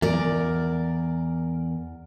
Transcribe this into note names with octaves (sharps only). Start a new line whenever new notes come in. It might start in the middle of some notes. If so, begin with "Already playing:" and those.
E2 A#4 D5